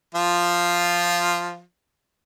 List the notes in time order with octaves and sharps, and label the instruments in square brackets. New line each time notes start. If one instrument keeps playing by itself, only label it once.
[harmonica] F3 F4